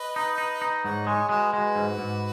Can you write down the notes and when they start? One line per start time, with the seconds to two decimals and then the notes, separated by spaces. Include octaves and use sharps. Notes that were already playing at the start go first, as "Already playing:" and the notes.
Already playing: B4 D#5
0.16 D#4
0.38 D#4
0.62 D#4
0.84 G#2 C#5 F#5
1.07 G#3 G#4 C#5
1.29 G#3 F#4 B4
1.52 G#3 F#4 B4
1.76 G#2
1.98 G#2